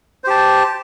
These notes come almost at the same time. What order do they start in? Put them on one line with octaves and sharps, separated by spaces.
C5 G4 A5